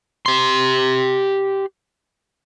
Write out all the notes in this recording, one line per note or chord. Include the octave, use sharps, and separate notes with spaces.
G4 C6